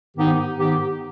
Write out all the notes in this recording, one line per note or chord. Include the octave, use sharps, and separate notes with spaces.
G#2 D#3 B3 D#4 G4
G#2 D#3 B3 D#4 G4